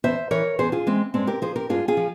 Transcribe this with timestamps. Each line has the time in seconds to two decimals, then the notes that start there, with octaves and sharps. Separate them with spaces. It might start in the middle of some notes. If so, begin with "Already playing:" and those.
0.04 E2 C5 E5
0.31 E3 A#4 C#5
0.59 E2 G#4 C5
0.72 F4 G#4
0.86 E3 G#3 C4
1.14 G2 G#3 C4
1.27 G4 A#4
1.42 F3 G#4 C5
1.56 G4 A#4
1.69 G2 F4 G#4
1.88 F4 G#4
1.97 F3